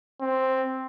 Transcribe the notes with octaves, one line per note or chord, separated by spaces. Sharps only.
C4